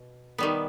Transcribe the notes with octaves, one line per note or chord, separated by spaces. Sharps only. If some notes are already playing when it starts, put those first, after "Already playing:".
Already playing: B2
D#3 G3 B3